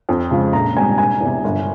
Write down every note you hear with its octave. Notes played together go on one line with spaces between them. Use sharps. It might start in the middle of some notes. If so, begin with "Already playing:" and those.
F2
C#3 F3 G#3
A#1 A#5
G#2 G3 C4 G#5
E1 G#5
E2 C3
G1